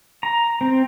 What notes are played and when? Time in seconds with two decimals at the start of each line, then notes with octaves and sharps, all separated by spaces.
0.23 A#5
0.61 C4